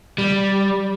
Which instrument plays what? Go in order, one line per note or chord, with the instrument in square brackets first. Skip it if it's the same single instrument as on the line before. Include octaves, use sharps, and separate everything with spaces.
[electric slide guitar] G3